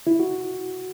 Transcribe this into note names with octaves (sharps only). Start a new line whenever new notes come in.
E4
F#4